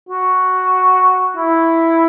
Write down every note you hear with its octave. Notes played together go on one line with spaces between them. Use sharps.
F#4
E4